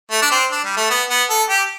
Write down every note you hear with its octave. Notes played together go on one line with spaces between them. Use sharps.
A3
D4
C4
D4
G3
A3
B3
B3
A4
G4